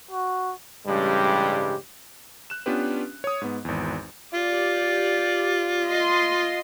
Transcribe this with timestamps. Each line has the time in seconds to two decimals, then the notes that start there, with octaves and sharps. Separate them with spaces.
0.11 F#4
0.87 A1 G2 C#3 G3 G#3 G4
2.50 F#6 E7
2.66 B3 C#4 D4 F4 G4 B4
3.24 C#5 D#6
3.41 G#2 B3
3.65 G#1 E2
4.34 F4 G4 D5
5.87 D#5 C6